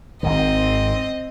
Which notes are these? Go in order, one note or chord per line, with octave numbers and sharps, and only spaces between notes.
G#1 G#2 D#3 C4 D#5